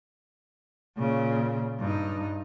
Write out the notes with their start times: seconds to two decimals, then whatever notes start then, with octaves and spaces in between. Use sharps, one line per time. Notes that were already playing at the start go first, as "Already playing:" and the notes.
0.97 A#2 C#3
1.79 G2 D#4